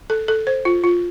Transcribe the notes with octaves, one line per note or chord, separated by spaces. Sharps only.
A4
A4
C5
F4
F4